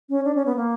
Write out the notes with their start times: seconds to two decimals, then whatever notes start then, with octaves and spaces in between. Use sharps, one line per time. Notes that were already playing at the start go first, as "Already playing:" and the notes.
0.09 C#4
0.25 D4
0.35 C#4
0.46 B3
0.56 A#3